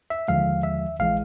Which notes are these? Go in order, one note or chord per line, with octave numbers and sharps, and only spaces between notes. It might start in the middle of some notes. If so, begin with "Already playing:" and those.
E5
D#2 D3 F3 G#3 F5
E5
A#1 E3 G#3 F5